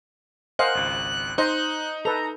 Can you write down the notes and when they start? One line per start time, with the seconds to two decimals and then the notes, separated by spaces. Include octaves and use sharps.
0.59 A#4 C5 D#5 F5 F#5 G#5 F#6
0.75 G#1 C#2
1.38 D#4 C5 D#5 F#6
2.05 A4 B4 A#5